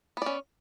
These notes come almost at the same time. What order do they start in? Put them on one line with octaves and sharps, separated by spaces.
B3 D5 C#4